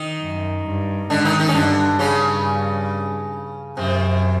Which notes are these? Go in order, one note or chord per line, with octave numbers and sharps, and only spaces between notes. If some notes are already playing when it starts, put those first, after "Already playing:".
Already playing: D#3 D#4
F#2
G2
G#2 D3 D4
D#3 D#4
D#3 D#4
C#4
G2 D3 D4
G2 C#3 C#4
F#2 C3 C4